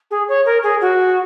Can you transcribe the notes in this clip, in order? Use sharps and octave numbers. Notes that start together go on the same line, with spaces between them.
G#4
C#5
A#4
G#4
F#4